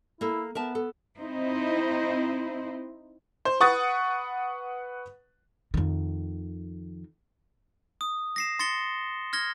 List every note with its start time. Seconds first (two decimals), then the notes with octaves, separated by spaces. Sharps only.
0.21 A#3 E4 A4
0.55 B3 A#4 E5 A5
0.75 A4
1.19 C4 D#4 E4 C5
3.45 C5
3.60 B4 F#5 C#6 D#6 A6
5.74 F2 D#3
8.01 D#6
8.36 A#6 C7 E7
8.59 C6 A6 A#6 C#7 G7
9.33 F6 G#6 A#6 G7